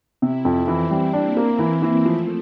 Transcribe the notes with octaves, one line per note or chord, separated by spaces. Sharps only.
C3 E4
F2
E3 C4
G3
A#3 D4
A#3
E3
E3
F3 A3